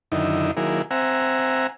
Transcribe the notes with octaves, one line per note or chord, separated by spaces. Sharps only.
F#2 D3 D#3 D#4 E4
D#3 F#3 A#3 E4 G#4
C4 E5 F#5 G#5 A#5